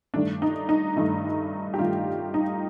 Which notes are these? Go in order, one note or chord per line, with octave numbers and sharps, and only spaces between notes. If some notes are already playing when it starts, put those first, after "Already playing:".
G2 D#3 A3 D4
D#4
D#4
G2 D#3 A3
G4
G2 D#3 A3 F4
D#4